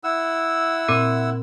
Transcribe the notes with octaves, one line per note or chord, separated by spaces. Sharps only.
E4 F#5 E6
A#2 C4